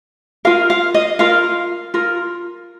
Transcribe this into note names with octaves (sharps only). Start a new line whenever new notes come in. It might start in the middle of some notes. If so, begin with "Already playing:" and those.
F4 A#4 F5
F5
D#5
F4 A#4 F5
F4 A#4